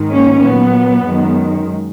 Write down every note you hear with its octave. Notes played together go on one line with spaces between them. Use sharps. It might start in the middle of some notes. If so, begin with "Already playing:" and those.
Already playing: G#2 D#3 G#3
A#3 C#4
A#2 F#3 B3
F#2 D#3 G#3